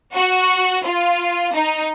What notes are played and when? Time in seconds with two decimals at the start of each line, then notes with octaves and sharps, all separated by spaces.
0.13 F#4
0.84 F4
1.54 D#4